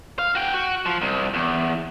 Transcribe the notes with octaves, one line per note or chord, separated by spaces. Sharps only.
F5
F#4 G5
F#4
F3
C2
E2